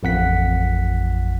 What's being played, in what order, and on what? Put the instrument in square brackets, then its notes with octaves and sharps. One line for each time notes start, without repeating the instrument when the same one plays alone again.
[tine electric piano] A1 F2 F#5 B6